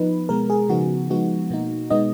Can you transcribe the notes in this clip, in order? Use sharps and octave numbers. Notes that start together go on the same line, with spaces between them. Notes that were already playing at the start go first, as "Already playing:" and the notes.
Already playing: F3 B3 D#4 B4
B2 G#3 B3 A#4
G#4
C#3 F3 B3 D#4 F#4
F3 G#3 B3 D#4 F#4
B2 A#3 D#4
B2 G#3 B3 D#4 D#5